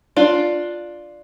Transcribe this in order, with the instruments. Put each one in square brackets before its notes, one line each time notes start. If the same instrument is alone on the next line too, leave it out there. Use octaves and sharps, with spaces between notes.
[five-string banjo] D4 F4